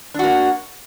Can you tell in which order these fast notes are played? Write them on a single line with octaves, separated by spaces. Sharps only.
D4 F#4 A#3